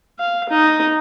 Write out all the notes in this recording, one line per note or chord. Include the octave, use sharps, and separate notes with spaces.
F5
D#4